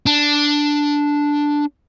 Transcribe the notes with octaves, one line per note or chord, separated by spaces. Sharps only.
D4